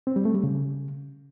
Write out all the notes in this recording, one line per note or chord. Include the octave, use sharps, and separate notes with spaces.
C4
G3
A3
G3
C#3